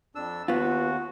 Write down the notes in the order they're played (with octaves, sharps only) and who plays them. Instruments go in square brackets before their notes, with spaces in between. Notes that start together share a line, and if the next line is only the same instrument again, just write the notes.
[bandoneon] F2 D4 E6
[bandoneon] D#2 F#4 [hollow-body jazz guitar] B3 F4